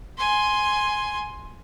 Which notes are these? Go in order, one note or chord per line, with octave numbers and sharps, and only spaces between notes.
G#5 C6